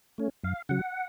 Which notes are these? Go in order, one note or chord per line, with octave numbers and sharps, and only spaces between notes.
A3 C#4
F#2 F5
C#3 F#3 F#5